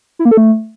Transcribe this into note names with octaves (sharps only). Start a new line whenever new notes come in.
E4
A#3
A4
A3